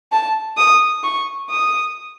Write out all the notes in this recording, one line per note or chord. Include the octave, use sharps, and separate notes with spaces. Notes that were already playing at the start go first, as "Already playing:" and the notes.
A5
D#6
C#6
D#6